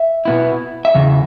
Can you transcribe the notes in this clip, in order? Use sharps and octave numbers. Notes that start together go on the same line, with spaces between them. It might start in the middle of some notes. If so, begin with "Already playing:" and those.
Already playing: E5
B2 B3 E4
E5
E2 C#3